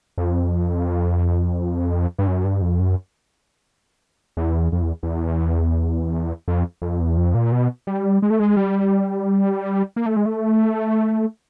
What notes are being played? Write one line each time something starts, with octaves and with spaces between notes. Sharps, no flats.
F2
G2
F#2
G2
F2
F#2
E2
F2
E2
E2
F2
F2
E2
F2
A#2
B2
G3
G#3
A3
G#3
G3
A#3
A3
G#3
A3